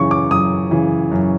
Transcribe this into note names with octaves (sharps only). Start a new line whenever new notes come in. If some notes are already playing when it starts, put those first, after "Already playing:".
Already playing: F#2 C#3 E3 C#6
D6
F#2 D#6
C#3 E3
F#2